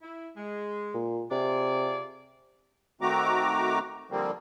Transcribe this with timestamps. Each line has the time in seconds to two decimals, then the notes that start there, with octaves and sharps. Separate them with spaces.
0.02 E4
0.37 G#3
0.94 A#2
1.31 C3 F4 G#4 D5
3.01 D#3 A3 C4 F#4 A#5 D6
4.11 D3 F3 G3 A#3 C4